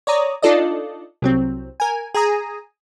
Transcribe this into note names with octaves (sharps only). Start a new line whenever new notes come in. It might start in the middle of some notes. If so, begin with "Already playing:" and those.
C#5 D5 A#5 D#6
D4 D#4 F4 A4 D5 D#5
C2 F#3 C4
A#4 G#5
G#4 G#5 A#5 D#6